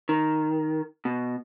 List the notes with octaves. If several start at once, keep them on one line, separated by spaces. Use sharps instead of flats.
D#3
B2